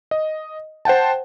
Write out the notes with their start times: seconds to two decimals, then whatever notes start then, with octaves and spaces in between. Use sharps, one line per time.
0.11 D#5
0.85 C5 F#5 G5 A5